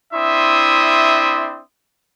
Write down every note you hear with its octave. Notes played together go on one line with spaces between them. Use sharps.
C4 D4 E4 E5 C6 D#6